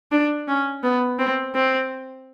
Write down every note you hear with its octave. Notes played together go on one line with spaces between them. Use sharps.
D4
C#4
B3
C4
C4